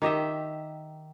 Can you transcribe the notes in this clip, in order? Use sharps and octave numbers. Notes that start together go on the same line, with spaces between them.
D#3 G4 D#5 E5